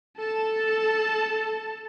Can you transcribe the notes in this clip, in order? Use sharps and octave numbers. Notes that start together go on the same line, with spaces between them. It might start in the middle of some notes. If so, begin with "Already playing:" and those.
A4 A5